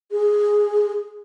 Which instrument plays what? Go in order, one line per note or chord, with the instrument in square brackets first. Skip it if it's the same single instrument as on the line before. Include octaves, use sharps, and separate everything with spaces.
[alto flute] G#4